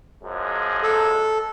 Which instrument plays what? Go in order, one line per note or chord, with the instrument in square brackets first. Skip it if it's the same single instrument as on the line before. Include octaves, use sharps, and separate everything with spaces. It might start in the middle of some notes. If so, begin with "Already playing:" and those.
[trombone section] F#2 F3 G#3
[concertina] A4